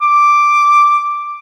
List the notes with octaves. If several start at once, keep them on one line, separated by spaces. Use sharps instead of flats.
D6